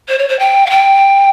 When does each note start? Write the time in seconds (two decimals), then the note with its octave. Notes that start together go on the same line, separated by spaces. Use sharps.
0.08 C5
0.18 C#5
0.28 C5
0.39 G5
0.66 F5
0.70 G5